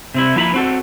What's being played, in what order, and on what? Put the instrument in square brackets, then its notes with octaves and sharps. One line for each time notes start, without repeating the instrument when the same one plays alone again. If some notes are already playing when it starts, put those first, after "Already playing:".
[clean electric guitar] C3 C4 E4
F3 A#3 E4 E5 A#5 B5
C4 F#4 A4